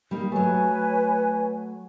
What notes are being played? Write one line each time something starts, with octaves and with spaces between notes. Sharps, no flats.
G3 A#3 D#4
F#3 A3 B4 C#5 G#5